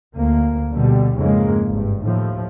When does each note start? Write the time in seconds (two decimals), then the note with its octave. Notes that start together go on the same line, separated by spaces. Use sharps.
0.15 D2 A#3
0.72 B2 D3 G3
1.15 F2 G#2 C#3 G#3 A#3
1.67 G#1 G2
2.02 D#2 A2 F3